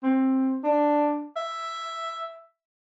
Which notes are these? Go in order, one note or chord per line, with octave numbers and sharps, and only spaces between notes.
C4
D4
E5